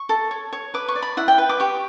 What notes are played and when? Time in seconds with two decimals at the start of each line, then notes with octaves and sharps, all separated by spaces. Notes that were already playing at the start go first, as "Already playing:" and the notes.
Already playing: C#6
0.09 A4
0.31 C#5
0.53 C#5
0.74 B4 D6
0.88 C#6
0.95 D5
1.02 B5
1.17 E4 F#5
1.28 G5
1.38 B4
1.49 D6
1.60 G4 C#6